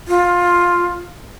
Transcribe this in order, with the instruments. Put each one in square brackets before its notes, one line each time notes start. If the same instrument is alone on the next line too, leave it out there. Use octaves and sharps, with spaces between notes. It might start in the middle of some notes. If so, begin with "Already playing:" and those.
[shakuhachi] F4